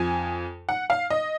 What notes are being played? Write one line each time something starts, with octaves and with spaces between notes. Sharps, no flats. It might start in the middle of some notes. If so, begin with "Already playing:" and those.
Already playing: F2 F3 G#5
F#5
F5
D#5